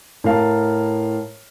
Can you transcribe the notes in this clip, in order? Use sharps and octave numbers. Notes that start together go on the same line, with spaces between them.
A2 A#4 F5 A5